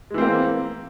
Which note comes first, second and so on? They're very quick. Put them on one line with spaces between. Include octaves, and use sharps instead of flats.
G#3 E3 C4 A#3